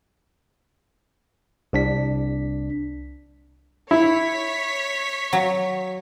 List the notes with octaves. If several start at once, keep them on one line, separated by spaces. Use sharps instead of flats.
C2 D4 B6
E4 C#5 B6
F#3